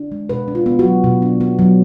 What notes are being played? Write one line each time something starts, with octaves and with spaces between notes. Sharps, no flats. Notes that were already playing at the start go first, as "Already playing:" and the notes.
Already playing: D4
G#3
B2 B4
D4
F4
B3
F#4
F#3
B2
D4
B3
F#3